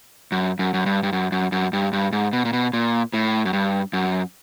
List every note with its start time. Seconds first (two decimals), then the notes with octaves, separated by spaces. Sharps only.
0.32 F#2
0.59 F#2
0.74 F#2
0.86 G2
1.03 G2
1.12 F#2
1.32 F#2
1.52 F#2
1.73 G2
1.93 G2
2.13 G#2
2.33 B2
2.45 A#2
2.53 B2
2.73 A#2
3.13 A2
3.45 F#2
3.53 G2
3.93 F#2